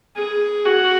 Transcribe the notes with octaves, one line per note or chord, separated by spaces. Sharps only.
G#4
F#4